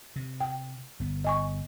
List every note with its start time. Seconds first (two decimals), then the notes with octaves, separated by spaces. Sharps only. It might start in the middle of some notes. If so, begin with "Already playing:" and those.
0.16 C3
0.40 G5
1.00 G1 B3
1.24 D#5 G#5 C#6